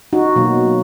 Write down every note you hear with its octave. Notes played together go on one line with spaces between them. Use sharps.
D#4 F#4
B2 F#3 A#3